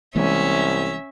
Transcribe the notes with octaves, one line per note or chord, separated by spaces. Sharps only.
C2 E3 G#3 A#3 C#4 E5